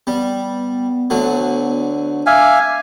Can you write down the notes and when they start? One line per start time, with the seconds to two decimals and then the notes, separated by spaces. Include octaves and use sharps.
0.07 G3 B3
1.10 D2 D3 F#3
2.26 E5 F5 G#5 D6